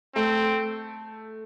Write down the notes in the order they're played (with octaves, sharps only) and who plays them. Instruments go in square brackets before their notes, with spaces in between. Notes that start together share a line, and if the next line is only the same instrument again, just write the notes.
[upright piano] A3 [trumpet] C4